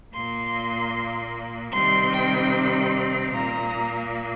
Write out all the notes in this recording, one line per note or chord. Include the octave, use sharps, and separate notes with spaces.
A#2 A#3 C6
C3 D#3 G3 C4 C6
G5
A#2 A#3 A#5